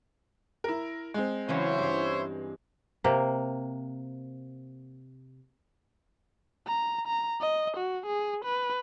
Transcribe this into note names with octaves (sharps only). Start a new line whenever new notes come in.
E4 A#4
G#3 C4
C#3 E3 F#3 E4 C5 C#5
G2 C6
C3 A#3
A#5
A#5
D#5
F#4
G#4
B4